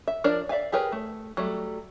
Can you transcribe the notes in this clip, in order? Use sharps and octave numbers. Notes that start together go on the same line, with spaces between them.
E5
F3 D4 A#4 C#5 D5
D5 E5 F5 G#5
G4 G#4 A#4 B4 C#5
A3
F#3 G3 A3